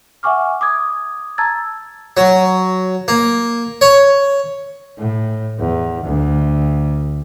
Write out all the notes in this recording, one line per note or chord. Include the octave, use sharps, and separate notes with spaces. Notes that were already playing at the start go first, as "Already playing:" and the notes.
E5 F#5 G#5 C#6 D6 F6
D6 D#6 G#6
A5 A#5 E6 G#6 A6
F#3
A#3
C#5
A2
E2
D2